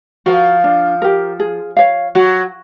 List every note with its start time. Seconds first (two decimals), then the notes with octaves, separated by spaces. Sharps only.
0.26 F3 F#4 A#4
0.64 D4
1.02 G4 A#4
1.40 G#4
1.77 C#5 F5
2.15 F#3 F#4